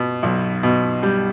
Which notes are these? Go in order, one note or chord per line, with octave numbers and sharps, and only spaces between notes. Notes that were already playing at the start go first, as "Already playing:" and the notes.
Already playing: B2
B1
B2
G3